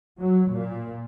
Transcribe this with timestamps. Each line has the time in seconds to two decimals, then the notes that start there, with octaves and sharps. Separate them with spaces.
0.20 F#3
0.51 A#2